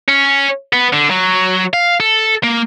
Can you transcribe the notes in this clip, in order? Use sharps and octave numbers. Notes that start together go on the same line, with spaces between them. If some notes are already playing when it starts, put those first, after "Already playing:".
C#4
B3
D3
F#3
F5
A4
A#3